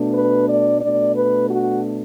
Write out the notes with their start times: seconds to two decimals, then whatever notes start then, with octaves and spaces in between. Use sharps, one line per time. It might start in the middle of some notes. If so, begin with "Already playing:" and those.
Already playing: B2 A3 D4
0.14 B4
0.48 D5
0.82 B2 A3 D4 D5
1.16 B4
1.50 F#4